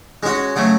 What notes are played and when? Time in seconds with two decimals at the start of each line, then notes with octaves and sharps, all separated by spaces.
0.23 G#3 C#4 F#4
0.56 C#3 F#3 A3